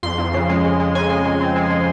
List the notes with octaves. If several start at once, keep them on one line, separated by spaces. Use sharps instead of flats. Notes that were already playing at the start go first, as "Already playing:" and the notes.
F2 C6
F2
C#3
G#3
G#3
G#3
C#3 G#5
G#3
G#3
C4
G#3
G#3